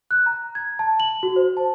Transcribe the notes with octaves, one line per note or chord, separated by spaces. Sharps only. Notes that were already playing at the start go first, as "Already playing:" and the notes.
F#6
A#5
G#6
A5
F#7
F#4
C5
A5